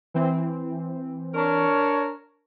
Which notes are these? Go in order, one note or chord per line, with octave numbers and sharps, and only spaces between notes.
E3 C4
D4 A#4 C#5